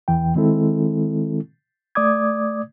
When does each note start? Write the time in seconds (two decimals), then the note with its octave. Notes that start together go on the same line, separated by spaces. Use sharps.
0.08 E2 E3 G5
0.35 D#3 G#3 C4 E4 A4
1.95 A3 D5 D6 D#6 G#6